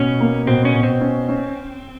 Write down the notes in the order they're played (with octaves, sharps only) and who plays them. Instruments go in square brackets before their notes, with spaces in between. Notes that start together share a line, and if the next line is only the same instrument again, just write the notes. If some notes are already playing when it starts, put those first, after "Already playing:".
Already playing: [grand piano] B2 [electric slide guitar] C#4
[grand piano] A#3
[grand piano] B2 [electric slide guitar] C4
[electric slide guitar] C#4
[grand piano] B2
[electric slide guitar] C4
[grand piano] C#4
C#4